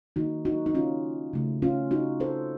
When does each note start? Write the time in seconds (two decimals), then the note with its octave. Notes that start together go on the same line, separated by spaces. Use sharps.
0.16 D#3 A#3 D#4 F#4
0.45 D#4 F#4
0.66 D#4
0.75 C#4 F4
1.33 C#3 A3
1.62 C#4 F4
1.91 D#4 F#4
2.20 A4 C5